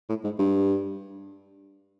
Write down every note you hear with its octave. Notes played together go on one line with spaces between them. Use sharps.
A2
G#2
G2